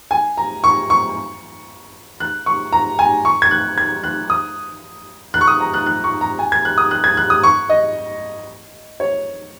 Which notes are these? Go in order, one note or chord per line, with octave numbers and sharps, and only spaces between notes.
G#5
A#5
C#6
C#6
F#6
C#6
A#5
G#5
C#6
G#6
F#6
G#6
F#6
D#6
F#6
C#6
D#6
A#5
F#6
F#6
C#6
A#5
G#5
G#6
F#6
D#6
F#6
G#6
F#6
D#6
C#6
D#5
C#5